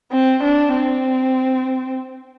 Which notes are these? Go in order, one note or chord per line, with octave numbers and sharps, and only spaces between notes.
C4
D4
C4